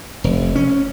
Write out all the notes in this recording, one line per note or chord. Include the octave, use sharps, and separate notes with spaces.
F1
C#4